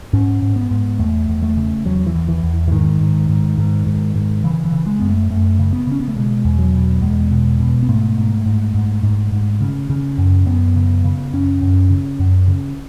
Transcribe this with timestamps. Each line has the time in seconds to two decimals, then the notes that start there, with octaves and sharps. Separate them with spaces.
0.13 G#2 C#4
0.42 G#2
0.56 B3
0.71 G#2
0.99 E2 A3
1.29 E2
1.43 A3
1.57 C#3
1.85 E2 F#3
2.07 E3
2.14 E2
2.29 E3
2.43 E2
2.68 E3
2.71 G#2 D#3
3.00 G#2
3.29 G#2
3.58 G#2
3.86 G#2
4.15 G#2
4.44 C#3 E3
4.65 E3
4.72 C#3
4.87 G#3
5.00 F#2 B3
5.08 A3
5.30 F#2 A3
5.59 C#3
5.73 B3
5.87 C#3 C#4
6.00 B3
6.08 A3
6.16 B2 G#3
6.44 E2
6.59 F#3
6.74 B2
7.02 E2 G#3
7.31 B2
7.60 B2
7.83 B3
7.88 G#2 A3
8.17 G#2
8.46 G#2
8.74 G#2
9.03 G#2
9.32 G#2
9.61 C#3
9.90 C#3
10.18 F#2
10.46 F#2 B3
10.75 C#3
11.04 C#3
11.33 F#2 C#4
11.61 F#2
11.90 C#3
12.19 F#2
12.48 C#3